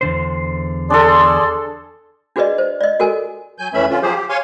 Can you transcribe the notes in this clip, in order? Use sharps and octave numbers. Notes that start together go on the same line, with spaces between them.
E2 D3 C5
D4 G#4 A4 D5 A5 C6
D4 F#4 G#4 B4 D5 D#5
C5
D5 D#5
F#4 A4 A#4 G#5
F#3 G#5 G6
F2 E3 A3 C#4 E5 B5
D3 C#4 F4
F3 F#3 G4 G#4 C5
G4
C#5 F5 G#5 C6